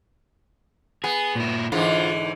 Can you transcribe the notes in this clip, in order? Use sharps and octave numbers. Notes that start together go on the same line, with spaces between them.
B3 G#4
A#2 E4
G#2 D3 E3 F4